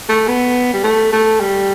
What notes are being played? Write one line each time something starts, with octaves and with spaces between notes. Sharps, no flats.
A3
B3
G3
A3
A3
G3